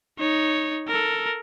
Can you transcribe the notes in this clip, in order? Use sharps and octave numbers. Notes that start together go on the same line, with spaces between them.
D#4 C#5
A4 A#4